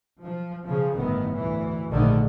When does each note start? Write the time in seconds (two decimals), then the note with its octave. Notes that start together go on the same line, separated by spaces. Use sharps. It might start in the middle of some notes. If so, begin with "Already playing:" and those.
0.23 F3
0.65 C#3 F3
0.96 G1 A2 D#3 B3
1.37 D2 E3
1.91 A#1 G#2 D3 D#3 A3